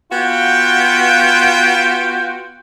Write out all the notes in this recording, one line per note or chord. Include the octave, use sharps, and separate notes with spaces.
B3 F4 F#4 F5 G5